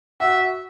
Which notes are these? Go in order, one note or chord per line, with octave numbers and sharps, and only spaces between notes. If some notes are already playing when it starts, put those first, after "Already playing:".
F#4 E5